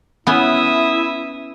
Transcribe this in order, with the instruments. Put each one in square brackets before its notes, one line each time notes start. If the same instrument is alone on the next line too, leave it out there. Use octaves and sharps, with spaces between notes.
[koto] B3 C#4 [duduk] E4 [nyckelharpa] E5 D#6